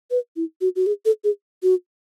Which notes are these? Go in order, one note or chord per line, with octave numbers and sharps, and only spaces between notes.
B4
E4
F#4
F#4
G#4
A4
G#4
F#4